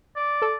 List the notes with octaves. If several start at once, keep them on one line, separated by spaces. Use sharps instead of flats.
D5
A4